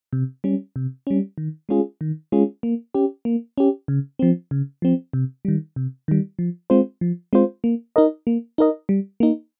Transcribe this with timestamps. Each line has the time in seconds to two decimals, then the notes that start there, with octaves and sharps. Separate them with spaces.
0.13 C3
0.44 G3 C#4
0.76 C3
1.07 G3 C#4
1.38 D#3
1.69 G#3 C#4 F4 G#4
2.01 D#3
2.32 G#3 C#4 F4 G#4
2.63 A#3
2.95 C#4 G4
3.25 A#3
3.58 C#4 G4
3.88 C#3
4.19 F3 C4
4.51 C#3
4.82 F3 C4
5.13 C3
5.45 D#3 G3
5.76 C3
6.08 D#3 G3
6.39 F3
6.70 G#3 C4 F4 C5
7.01 F3
7.33 G#3 C4 F4 C5
7.64 A#3
7.96 D#4 A#4 D#5
8.27 A#3
8.58 D#4 A#4 D#5
8.89 G3
9.20 A#3 D#4